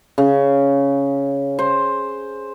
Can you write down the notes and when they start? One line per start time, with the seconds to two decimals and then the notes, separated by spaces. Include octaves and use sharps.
0.18 C#3
1.59 C5